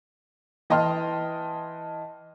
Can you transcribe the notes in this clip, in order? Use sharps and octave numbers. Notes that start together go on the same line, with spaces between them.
E3 D#5 G5 A5 C6 F6